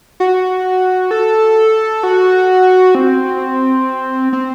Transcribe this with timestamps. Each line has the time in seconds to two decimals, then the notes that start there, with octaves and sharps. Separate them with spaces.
0.20 F#4
1.11 A4
2.03 F#4
2.95 C4
4.33 C4